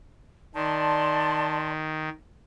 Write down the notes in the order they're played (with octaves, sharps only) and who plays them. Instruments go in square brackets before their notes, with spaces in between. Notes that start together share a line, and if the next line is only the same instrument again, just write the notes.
[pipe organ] D#3 [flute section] D5 A5 C6